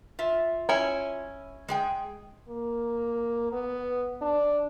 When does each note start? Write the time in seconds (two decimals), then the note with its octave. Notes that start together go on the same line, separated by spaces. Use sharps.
0.19 F4 E5
0.69 C#4 E4
1.68 G#3 G#4 G5
2.48 A#3
3.52 B3
4.21 D4